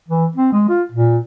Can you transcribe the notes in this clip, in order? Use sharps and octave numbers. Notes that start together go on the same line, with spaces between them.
E3
C4
G#3
F4
A#2